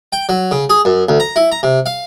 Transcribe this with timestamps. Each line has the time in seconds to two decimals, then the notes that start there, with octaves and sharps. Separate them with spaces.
0.13 G5
0.29 F#3
0.51 C#3
0.70 G#4
0.85 F#2
1.09 D2
1.20 A#5
1.36 E4
1.52 A#5
1.63 C3
1.86 F5